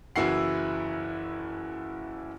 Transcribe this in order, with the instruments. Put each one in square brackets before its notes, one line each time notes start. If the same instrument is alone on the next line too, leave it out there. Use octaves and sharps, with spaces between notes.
[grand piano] F#1 E3 E4 F#4 F#5 C7